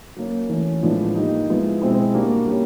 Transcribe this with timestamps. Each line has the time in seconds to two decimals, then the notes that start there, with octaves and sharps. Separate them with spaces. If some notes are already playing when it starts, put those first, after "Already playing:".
0.16 F#3 A#3 C#4
0.49 E3 A3 C#4
0.83 A2 F3 G#3 B3 D4
1.15 G3 A#3 D#4
1.49 F3 G#3 B3 E4
1.82 B2 G#3 C4 E4
2.14 G3 A#3 D4 F#4
2.47 G3 A#3 C#4